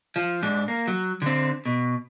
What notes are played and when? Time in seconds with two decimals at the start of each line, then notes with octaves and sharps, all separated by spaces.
0.16 F3
0.43 G#2 D4
0.68 A#3
0.87 F#3
1.22 D3 C4
1.65 B2